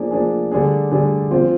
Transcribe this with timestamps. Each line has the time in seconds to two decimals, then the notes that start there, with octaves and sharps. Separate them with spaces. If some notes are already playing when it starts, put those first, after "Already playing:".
Already playing: F3 A#3 D4 G#4
0.11 F3 A#3 D4 G#4
0.52 D3 G3 D4 G#4
0.91 D3 G3 D4 G#4
1.31 F3 C4 F4